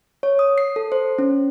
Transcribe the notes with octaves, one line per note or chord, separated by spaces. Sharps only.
C#5
D#6
C7
A4
C5
C#4